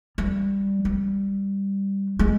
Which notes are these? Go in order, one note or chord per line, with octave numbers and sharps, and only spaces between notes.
G3
G3
G#3